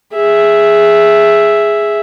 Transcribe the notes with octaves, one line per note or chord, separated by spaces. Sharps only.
G#4 E5